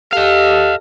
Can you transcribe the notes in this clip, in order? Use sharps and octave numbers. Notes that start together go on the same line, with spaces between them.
G4 A4 D#5 F5